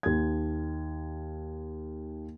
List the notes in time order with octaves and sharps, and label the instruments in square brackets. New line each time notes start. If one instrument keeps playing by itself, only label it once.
[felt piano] D#2 G#6